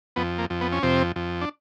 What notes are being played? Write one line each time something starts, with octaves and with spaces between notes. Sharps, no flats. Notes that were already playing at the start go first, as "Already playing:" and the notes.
F2 B3
A#3
F2
B3
C#4
F2 C3 C4
F2
D4